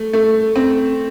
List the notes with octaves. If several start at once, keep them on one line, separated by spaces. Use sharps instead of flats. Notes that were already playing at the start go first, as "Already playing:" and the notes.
Already playing: A3
A3
C4